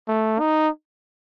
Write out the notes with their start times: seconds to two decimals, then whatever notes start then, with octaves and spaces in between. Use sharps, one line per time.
0.08 A3
0.40 D#4